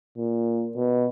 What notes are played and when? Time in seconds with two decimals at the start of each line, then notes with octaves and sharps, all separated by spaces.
0.17 A#2
0.76 B2